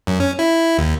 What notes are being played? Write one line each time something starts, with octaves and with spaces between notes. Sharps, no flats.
F#2
C#4
E4
D#2